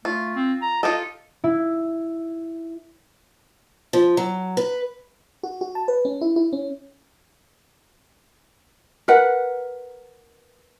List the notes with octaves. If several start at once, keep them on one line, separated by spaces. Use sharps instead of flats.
A3 F4
C4
A#5
F4 G4 A4 D#5
E4
F3
F#3
B4
F#4
F#4
A5
B4
C#4
E4
E4
C#4
A#4 B4 F#5